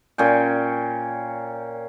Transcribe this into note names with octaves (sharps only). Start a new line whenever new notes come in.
A#2 C#4 G5